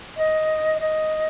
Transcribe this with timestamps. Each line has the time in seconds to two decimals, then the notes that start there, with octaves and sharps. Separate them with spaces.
0.16 D#5
0.79 D#5